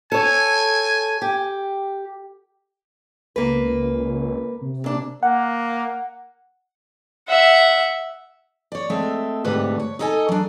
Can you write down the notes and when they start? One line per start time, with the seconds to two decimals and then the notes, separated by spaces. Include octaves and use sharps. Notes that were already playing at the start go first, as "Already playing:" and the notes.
0.12 A4 C#5 G#5
1.22 G4
3.36 C#2 A#3 B4
4.61 C3
4.84 A#2 D4
5.23 A#3 F#5
7.29 E5 F#5
8.72 C#5 D5
8.90 G#3 A3 C4 A4 E5
9.44 D2 G#2 C3 G3 A3 B4
9.80 C#5
9.99 D#4 E4 A4 D#5 G#5
10.29 F#3 D4